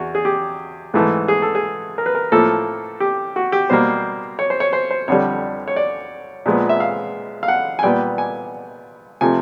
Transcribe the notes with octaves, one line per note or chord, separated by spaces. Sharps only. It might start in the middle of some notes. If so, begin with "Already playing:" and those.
Already playing: E2 F#4
G#4
G4
G#2 E3 A3
G#4
A4
G#4
A#4
B4
A#4
A2 F3 A#3 A4
G4
F#4
G4
B2 G3 A#3 C5
C#5
C5
C#5
C5
C5
F2 D3 G3 C#5
C#5
D5
A#2 F3 G#3 B3
E5
F5
F5
F#5
G#5
A#2 G3 B3 G5
G#5
C3 F3 A3 G#5